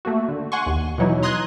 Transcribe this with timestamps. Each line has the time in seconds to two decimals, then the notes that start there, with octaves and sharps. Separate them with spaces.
0.05 A3 A#3 F#4
0.28 D3
0.52 F#5 G#5 C6 C#6
0.66 D#2
0.98 B2 E3 F#3 D#4 E4
1.23 A#5 C6 D#6 F#6 G#6